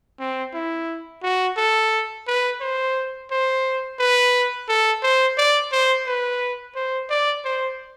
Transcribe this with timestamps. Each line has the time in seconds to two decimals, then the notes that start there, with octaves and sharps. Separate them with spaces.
0.20 C4
0.54 E4
1.23 F#4
1.57 A4
2.27 B4
2.61 C5
3.31 C5
3.99 B4
4.69 A4
5.03 C5
5.38 D5
5.72 C5
6.07 B4
6.75 C5
7.10 D5
7.45 C5